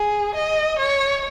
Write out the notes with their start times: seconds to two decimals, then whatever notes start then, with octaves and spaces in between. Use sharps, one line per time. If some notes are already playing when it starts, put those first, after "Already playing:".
Already playing: G#4
0.35 D#5
0.78 C#5